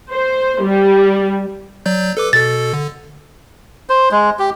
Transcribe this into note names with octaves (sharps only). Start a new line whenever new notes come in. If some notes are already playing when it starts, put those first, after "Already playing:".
C5
G3
F#3 D5 G6
A4 B4 D6
B2 A4 A6
D3
C5
G#3
G4